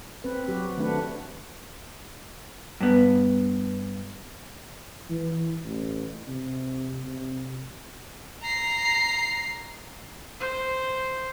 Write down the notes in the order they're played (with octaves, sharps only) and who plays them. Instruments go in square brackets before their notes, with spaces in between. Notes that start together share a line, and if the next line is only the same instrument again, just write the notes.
[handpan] C4 B4
F#3 F#4 G4
D#3 A3 C4 D4 B4 F#5
[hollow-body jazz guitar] G2 B3
[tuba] E3
A1
C3
C3
[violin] A#5 C7
[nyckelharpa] C5